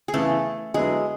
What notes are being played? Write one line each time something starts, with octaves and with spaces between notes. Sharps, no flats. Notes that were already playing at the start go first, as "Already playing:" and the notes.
G#4
C#3 E3 A3 B3 E4 A4
D3 F#3 G#3 B3 E4 G#4